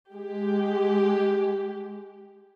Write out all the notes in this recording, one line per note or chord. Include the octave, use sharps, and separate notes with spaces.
G#3 G4